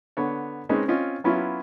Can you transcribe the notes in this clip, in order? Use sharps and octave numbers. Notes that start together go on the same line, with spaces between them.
D3 B3 C#5
G#3 C4 C#4 D#4 B4
C4 C#4 F4 D#5
F#3 B3 C#4 E4 F4